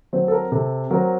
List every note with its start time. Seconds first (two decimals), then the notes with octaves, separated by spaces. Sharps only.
0.13 F#3 C4 C5
0.28 A4
0.32 A#4
0.52 C3 A4
0.91 F#3 C4 A#4